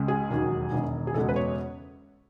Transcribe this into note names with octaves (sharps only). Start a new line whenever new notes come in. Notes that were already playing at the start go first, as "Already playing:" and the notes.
Already playing: C#2 C#3 G#3
G#4
E1 D#2 D#3 F#3
E1 E2 D#3
G#4
F#1 E2 B2 G#3 A4
B4
C#5